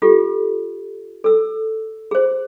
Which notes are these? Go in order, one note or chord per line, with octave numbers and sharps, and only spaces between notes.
F4 G4 A4
A4 E6
G#4 C5